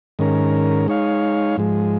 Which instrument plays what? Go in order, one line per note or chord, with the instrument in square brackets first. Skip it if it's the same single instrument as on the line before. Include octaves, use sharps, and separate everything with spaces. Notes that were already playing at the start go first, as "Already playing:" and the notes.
[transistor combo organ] G#2 D#3 C#4 A#4
G#3 D#4 C#5 F5
G#2 F3 G#3